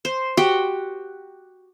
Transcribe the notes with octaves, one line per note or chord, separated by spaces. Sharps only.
C5
F#4 G4 G5